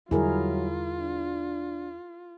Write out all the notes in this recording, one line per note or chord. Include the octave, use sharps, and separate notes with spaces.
E2 D3 F#3 G3 E4 F4 G#4 A#4
D4